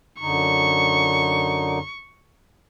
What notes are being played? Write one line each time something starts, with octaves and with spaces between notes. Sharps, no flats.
F#2 D3 D#4 C#6